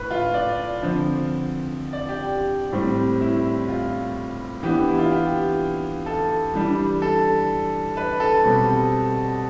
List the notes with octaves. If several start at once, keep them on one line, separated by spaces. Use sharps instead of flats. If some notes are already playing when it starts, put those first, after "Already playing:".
Already playing: A2 B4
F4
D5
D3 F3 C4
D5
G4
A2 G3 C4
E4
F4
E3 B3 D4 G4
E4
F4
G4
A4
E3 G3 D4
A4
B4
A4
B2 G3 C4